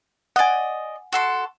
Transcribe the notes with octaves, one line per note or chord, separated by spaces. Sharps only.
D5 D#5 F#5 G#5
F#4 A4 C6